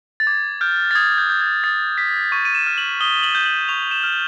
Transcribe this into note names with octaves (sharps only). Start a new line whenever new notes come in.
A6
D6 G#6
F6 G6
A6
D#6 G#6
G6
G6
G#6
D#6 A6
G6 B6
C#6 D#7
D#7
E7
F6
F#7
D#6 G7
F#7
G6
F#7
C#6 F7
E7
F6